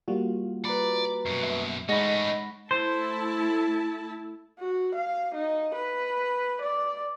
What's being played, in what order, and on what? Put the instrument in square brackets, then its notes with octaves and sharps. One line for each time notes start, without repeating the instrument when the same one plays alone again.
[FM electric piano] G3 A#3 F#4 [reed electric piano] F4
[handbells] B4 A#5 B5 [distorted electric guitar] D5
[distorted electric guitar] F#2 B2
[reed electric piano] E5
[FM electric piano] G#3 D#4 B5 [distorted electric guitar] A3 C#4 [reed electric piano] D#5 [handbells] F#5 A#6
[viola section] A3 E4 A5 [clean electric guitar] C5
[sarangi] F#4
F5
D#4
B4
D5